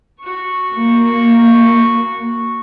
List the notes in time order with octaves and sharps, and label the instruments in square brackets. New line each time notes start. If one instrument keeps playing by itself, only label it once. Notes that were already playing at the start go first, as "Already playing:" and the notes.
[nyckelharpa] F#4 C#6
[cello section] A#3